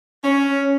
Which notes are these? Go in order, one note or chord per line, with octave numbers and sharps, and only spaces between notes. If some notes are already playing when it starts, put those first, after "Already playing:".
C#4